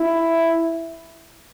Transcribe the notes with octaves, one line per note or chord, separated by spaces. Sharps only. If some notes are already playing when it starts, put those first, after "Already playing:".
Already playing: E4